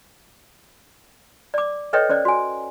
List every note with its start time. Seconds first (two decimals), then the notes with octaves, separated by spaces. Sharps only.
1.54 D5 D6
1.93 A4 B4 C#5 D#5 E5 G5
2.09 C#4 C5 D5
2.25 F#4 G#5